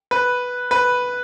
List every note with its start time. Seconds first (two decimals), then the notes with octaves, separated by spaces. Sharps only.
0.11 B4
0.71 B4